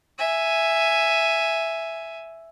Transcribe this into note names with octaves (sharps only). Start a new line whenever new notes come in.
E5 G#5